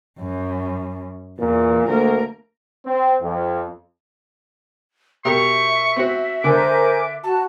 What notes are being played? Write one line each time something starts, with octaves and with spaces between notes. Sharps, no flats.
F#2
E2 A#2 E3
D2 A#3 A#4
C4
F2
B2 G4 A#4 E5 C#6
C4 F#4
D3 A#4 C5 G#5 D6
F#4 A5